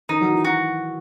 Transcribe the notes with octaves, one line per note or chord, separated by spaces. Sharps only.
D#3 D#4
F#3
E3
F#4